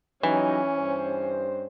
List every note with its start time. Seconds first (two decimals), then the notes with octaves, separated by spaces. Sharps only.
0.23 E3 F#3 G3 C#4 D#4
0.77 G2 C5